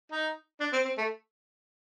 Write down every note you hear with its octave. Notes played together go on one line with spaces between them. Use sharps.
D#4
D4
C4
C4
A3